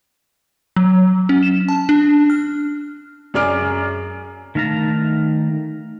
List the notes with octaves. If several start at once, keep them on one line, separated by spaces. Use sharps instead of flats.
F#3
C#4
E7
A5
D4
F6
F#2 G#4 D5 D6 F6 D7
D#3 A3 F5 A5 A#5